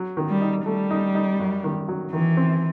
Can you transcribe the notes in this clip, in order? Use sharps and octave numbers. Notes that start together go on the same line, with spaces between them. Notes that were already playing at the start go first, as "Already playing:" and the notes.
Already playing: F#3
D#3
G3
D#4
G3 A3
D#4
D#4
F#2
D#3
F#3
D#3 E3
C4